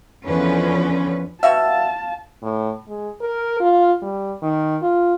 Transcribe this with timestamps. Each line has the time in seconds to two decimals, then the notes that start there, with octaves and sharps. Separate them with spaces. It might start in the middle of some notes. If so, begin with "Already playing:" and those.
0.24 E2 D3 F3 C#4 B4
1.43 B2 F#4 E5 F5 A5
2.42 A2
2.88 G#3
3.21 A#4
3.60 F4
4.02 G3
4.43 D#3
4.82 F4